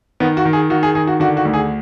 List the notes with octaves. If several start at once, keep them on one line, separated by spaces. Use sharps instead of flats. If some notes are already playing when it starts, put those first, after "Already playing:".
D#3 B3
F#4
D#3
G#4
D#3 F#4
G#4
D#3 G#4
F#4
D3 F#4
F#4
D2
G#4